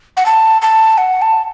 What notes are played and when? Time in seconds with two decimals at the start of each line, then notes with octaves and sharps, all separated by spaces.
0.17 F#5
0.26 A5
0.62 A5
0.98 F#5
1.22 A5